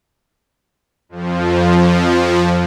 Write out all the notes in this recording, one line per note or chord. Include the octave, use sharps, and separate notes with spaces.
F2 F3